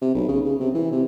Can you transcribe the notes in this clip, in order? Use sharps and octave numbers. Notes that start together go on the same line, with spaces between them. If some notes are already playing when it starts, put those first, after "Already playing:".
C3
B1
C#3
C#3
C3
E3
C3